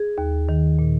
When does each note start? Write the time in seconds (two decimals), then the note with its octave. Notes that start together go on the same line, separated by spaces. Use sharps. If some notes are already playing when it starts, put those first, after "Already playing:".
Already playing: G#4
0.18 D#2
0.49 D#3
0.79 A#2